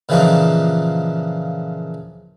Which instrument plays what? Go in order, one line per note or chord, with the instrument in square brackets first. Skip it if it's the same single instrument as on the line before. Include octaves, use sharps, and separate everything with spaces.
[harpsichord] A#2 C#3 E3 F3 D4 D#4